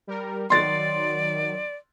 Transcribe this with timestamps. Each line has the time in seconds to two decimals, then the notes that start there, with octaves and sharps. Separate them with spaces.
0.07 G3 A#4
0.50 D#3 F#3 D5 C6 A6